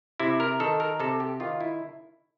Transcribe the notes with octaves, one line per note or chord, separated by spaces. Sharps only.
C3 E4
A#4
D#3 A4
A#4
C3 A4
G4
D#3 F4
E4